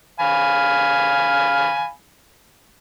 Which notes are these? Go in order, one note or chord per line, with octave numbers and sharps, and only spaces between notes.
F5 G#5 B5